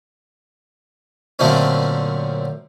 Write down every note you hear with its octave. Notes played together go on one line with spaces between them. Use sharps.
F#2 A#2 D3 A3 C4 C#4